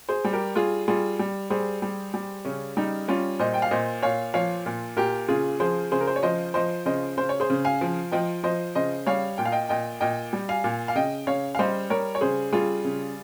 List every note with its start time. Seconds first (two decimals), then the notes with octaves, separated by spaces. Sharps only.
0.09 G#4 C5
0.24 G3
0.33 G4 A#4
0.56 G3 F4 G#4
0.88 G3 F4 G#4
1.19 G3
1.50 G3 G#4 C5
1.82 G3
2.14 G3
2.45 C#3 C#4
2.77 G3 D#4
3.08 G3 C#4 F4
3.39 A#2 C5 D#5
3.54 G5
3.62 F5
3.71 A#2 C5 D#5
4.02 A#2 C#5 F5
4.34 F3 C#5 F5
4.66 A#2
4.97 A#2 G4 A#4
5.28 C#3 F4 G#4
5.60 F3 G#4 C5
5.92 C#3 G#4 C5
6.01 A#4
6.07 C5
6.16 C#5
6.23 F3 C5 D#5
6.54 F3 C5 D#5
6.86 C#3 C5 D#5
7.17 C#3 C5
7.29 C#5
7.40 G#4 C5
7.50 C#3
7.65 F5 G#5
7.81 F3
8.12 F3 D#5 G5
8.43 F3 C5 D#5
8.75 C#3 C5 D#5
9.06 G3 C#5 F5
9.38 A#2 G5
9.45 F5
9.52 D#5 G5
9.69 A#2 D#5 G5
10.01 A#2 D#5 G5
10.33 G3
10.49 F5 G#5
10.64 A#2
10.88 F5
10.95 C#3 D#5 G5
11.27 C#3 C#5 F5
11.55 F5
11.59 G3 C5 D#5
11.90 G3 A#4 C#5
12.15 C#5
12.21 C#3 G#4 C5
12.53 G3 F4 G#4
12.84 C#3